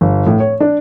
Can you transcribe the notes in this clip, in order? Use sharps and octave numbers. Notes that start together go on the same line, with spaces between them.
G1
A2
C#5
D4